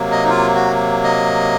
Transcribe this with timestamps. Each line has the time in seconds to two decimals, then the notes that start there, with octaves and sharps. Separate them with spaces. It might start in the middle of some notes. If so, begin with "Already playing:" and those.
Already playing: C3 F#3 A#3
0.11 D#5
0.24 D#4
0.30 F4
0.55 F#4
1.04 D#5